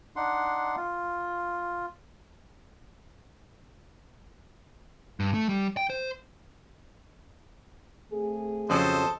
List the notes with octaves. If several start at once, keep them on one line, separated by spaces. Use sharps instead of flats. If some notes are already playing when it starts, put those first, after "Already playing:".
D4 D#4 F#5 C6
F4
G2
A3
G3
G5
C5
A3 C4 G#4
F2 C#3 F#3 A4 C5 D#5